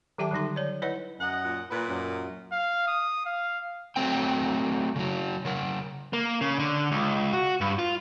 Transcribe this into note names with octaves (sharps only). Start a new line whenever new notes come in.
D#3 F#3 G4 E5 G5 A5
D3 F#3 G3 D#4 C6
C#5 D5
E4 B4 C#5 D#5 F#5
F#2 D#5 F#5
A#2
A#2 B4
F#2
F5
D#6
F5
F#3 A3 C4 G5
C#3 F#3
C#3 A#4
A#3
C#3
D3
C#2
F#4
G2
F4